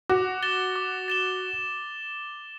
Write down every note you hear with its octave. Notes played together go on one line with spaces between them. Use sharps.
F#4 D6
A6 E7 G7
D6
A6 E7 G7